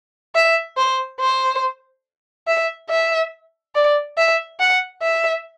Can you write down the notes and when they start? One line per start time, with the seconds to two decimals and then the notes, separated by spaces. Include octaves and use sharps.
0.35 E5
0.77 C5
1.20 C5
2.47 E5
2.90 E5
3.75 D5
4.18 E5
4.60 F#5
5.02 E5